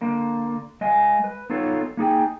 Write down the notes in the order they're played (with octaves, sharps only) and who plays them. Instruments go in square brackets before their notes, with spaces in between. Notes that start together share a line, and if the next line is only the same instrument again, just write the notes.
[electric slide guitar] D3 A#3
G#3 D#5 F5 G#5
B4
B3 D#4 F4 A4 C#5
A#3 D#4 G#4 G5